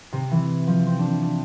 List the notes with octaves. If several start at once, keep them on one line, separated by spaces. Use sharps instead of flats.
C3
E3
F3
C4
D4
C4
D4